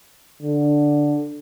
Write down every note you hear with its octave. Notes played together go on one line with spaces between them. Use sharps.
D3